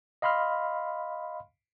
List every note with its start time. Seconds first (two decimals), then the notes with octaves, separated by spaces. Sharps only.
0.22 D#5 F5 B5 C6 F6